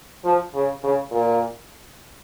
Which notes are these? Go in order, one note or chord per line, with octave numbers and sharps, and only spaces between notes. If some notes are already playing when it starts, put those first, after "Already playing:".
F3
C#3
C#3
A#2